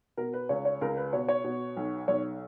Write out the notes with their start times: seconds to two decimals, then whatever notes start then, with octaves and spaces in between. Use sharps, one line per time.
0.17 B2 A#4
0.34 B4
0.49 C#2 C#5
0.65 C#5
0.81 C#2 A#4
0.97 B4
1.13 B2 C#5
1.28 C#5
1.44 B2
1.77 B1
2.08 B1 C#5